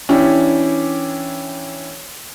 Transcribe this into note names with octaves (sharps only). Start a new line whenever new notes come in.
E3 C#4 D4 E4 G4